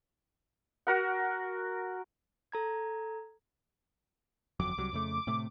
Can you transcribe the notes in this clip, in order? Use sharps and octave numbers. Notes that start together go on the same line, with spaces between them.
F#4 A#4 F#5
A4 A#5 G#6
G1 F2 F#3 D6
C2 F#3 G3
F2 C#3 A3
A2 C3 A3